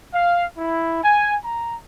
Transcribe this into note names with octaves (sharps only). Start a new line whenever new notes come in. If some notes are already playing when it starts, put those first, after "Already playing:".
F5
E4
G#5
A#5